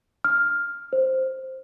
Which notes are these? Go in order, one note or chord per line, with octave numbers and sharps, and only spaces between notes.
F6
C5